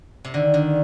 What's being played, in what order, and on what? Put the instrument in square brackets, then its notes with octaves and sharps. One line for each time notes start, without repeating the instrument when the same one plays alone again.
[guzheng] C3
[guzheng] D3 [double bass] D#3
[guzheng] D3